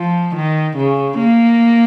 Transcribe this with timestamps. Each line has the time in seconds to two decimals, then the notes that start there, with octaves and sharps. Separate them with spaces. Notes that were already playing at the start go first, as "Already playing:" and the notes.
Already playing: F3
0.35 D#3
0.77 C#3
1.18 A#3